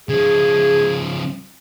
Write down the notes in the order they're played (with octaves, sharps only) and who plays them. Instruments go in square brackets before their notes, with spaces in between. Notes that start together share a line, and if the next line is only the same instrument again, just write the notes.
[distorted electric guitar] C#3 F3 [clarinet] G#4